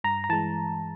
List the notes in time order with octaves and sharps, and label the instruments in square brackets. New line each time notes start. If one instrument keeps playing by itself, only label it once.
[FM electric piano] G2 A#5
A#5
E3 G#3 A5